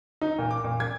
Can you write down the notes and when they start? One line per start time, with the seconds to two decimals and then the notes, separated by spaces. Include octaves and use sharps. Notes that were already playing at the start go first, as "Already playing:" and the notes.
0.21 D#4
0.39 A#2
0.51 D6
0.64 A#2
0.80 G#6